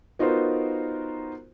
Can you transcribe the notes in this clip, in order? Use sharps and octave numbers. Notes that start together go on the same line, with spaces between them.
B3 D#4 F4 F#4 A#4 C5